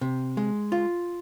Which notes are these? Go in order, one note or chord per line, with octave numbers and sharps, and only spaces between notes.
C3
G#3
F4